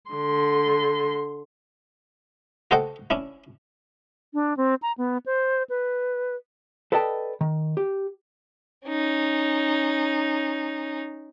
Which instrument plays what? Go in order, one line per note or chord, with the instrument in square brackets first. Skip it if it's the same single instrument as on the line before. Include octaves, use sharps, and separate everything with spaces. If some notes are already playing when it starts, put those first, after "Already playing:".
[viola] D3 C6
[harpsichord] F#4 A4 C5 D#5 F#5 G5
C#4 D4 E4
[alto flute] D4
C4
A#5
B3
C5
B4
[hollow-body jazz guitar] A4 B4 D5 D#5 G5 A5
D#3
G4
[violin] C#4 D#4